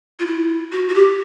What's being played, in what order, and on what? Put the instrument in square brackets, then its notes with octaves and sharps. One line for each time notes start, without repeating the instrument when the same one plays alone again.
[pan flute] F4
E4
F#4
F#4
G4